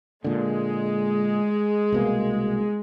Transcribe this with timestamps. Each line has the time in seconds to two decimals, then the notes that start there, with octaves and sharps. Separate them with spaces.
0.24 A#2 D3 G#3
1.92 C2 B2 A#3